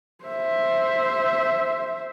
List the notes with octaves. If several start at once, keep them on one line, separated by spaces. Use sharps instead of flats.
C5 E5